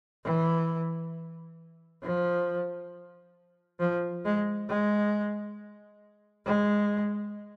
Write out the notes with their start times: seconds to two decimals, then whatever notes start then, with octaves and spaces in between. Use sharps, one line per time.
0.24 E3
2.03 F3
3.80 F3
4.25 G#3
4.69 G#3
6.46 G#3